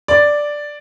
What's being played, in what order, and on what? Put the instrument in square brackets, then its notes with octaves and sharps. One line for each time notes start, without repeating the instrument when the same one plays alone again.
[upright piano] D5